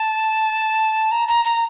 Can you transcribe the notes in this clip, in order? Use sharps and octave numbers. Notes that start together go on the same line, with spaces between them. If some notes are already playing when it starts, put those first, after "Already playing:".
Already playing: A5
A#5
A#5
A#5